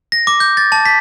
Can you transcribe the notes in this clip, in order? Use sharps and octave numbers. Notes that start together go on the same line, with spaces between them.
A#6
D6
G6
A6
A5
B6